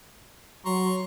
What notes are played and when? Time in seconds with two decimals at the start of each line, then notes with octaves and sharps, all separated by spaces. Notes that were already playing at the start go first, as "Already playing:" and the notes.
0.65 F#3 A#5 C6 C#6